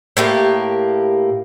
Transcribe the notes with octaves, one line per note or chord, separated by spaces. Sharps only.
A2 A#3 G4